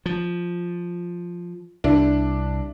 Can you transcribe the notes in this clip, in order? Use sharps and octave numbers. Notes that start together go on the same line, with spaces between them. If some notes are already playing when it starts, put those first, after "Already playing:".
F3
C2 D4 E4